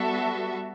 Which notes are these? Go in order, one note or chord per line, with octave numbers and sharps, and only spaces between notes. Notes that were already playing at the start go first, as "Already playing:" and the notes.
Already playing: G3 B3 F#4 A4 E5